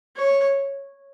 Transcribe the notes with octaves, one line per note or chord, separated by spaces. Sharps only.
C#5